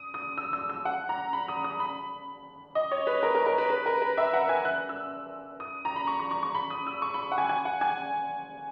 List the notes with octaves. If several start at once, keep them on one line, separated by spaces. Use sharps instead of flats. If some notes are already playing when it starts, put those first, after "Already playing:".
Already playing: D#6
D#6
E6
E6
E6
F#5
A#5
B5
D#6
D#6
B5
D#5
C#5
B4
A#4
A#4
A#4
B4
B4
A#4
B4
E5
F#5
G#5
F#6
E6
D#6
A#5
B5
C#6
C#6
C#6
C#6
B5
D#6
E6
C#6
B5
F#5
G#5
G#5
F#5
G#5